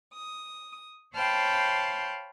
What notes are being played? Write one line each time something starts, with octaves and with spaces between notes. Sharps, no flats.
D#6
C5 C#5 F5 G5 A5 B5